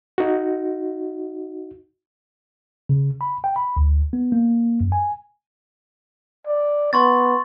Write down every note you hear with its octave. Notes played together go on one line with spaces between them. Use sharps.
D#4 F#4
C#3
B5
G5
B5
D2
B3
A#3
F#2
G#5
D5
B3 C6 C#6 A6